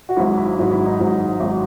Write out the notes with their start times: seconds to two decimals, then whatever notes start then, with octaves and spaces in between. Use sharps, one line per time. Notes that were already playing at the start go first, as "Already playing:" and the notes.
0.09 F#4
0.17 G#1 G#2 F#3 E4
0.38 E4
0.59 G#1 G#2 F#3 F#4
0.71 E4
0.86 D#4
1.00 G#1 G#2 F#3
1.40 G#1 F#3